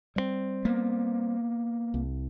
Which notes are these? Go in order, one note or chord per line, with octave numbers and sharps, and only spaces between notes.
G3 G#3 C4
A#3 B3
C2